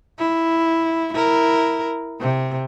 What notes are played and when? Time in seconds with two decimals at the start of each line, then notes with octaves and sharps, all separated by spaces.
0.19 E4
1.14 E4 A#4
2.21 C3